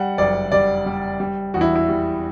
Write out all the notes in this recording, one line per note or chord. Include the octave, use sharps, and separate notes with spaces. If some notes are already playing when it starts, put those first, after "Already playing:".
Already playing: G3 F#5
F#1 D5
G3 D5
G3
G3
E2 F#4
E4
E4
G3